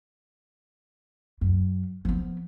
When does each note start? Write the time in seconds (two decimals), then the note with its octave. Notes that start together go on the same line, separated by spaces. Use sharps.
1.41 F#2
2.05 F3 B3